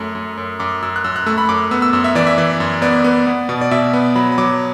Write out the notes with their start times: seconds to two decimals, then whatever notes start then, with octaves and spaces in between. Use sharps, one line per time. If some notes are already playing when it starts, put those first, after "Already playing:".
Already playing: F#2 A3
0.15 F#2
0.37 F#2
0.60 F#2 D6
0.82 F#2 E6
0.96 F#6
1.04 F#2 E6
1.16 F#6
1.26 A3 E6
1.38 B5
1.49 F#2 D6
1.71 B3 E6
1.82 E6
1.93 F#2 E6
2.04 E5
2.15 E3 D5
2.27 E5
2.38 E3 D5
2.60 F#2
2.82 B3 D5
3.04 B3
3.27 B3
3.49 B2
3.61 D5
3.71 B2 E5
3.93 B3
4.16 F#3 B5
4.32 B5
4.38 F#3 D6